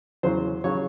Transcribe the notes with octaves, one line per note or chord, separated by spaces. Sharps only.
E2 C#3 F#3 C5
C#3 F#3 C#5